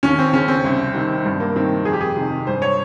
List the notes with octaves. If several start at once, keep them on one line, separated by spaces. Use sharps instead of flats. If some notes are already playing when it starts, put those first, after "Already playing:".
D#2 C#4
C4
C#3 C#4
C4
C2
C3 D#3
G2
A#3
D#3 C4
F2 G#4
G4
G#4
C3 D#3
G2 C5
C#5